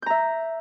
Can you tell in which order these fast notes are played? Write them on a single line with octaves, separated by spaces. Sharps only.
G6 A#5 E5